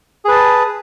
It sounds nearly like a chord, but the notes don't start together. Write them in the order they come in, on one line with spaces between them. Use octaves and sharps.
G#4 B4 A5